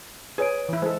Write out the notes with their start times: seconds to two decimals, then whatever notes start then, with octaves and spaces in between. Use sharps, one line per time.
0.38 G#4 B4 C#5 D7
0.69 E3 E4
0.82 G#3 A4 C5